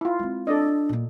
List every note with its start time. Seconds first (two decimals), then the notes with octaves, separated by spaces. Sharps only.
0.01 E4 F4
0.19 G#3 C4
0.47 D4 A4 D5 D#5
0.89 A#2 A#3